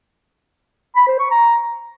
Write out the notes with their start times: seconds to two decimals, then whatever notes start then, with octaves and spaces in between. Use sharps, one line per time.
0.96 B5
1.08 C5
1.19 C#6
1.31 A#5